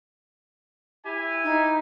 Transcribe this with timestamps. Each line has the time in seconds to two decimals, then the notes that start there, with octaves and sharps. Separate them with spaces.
1.05 E4 G4 G#5
1.44 D#4